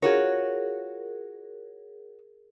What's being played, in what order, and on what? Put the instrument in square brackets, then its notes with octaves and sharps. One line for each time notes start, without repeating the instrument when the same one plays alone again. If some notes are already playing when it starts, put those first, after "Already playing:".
[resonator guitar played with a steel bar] F4 F#4 C#5 [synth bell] G#4 A#4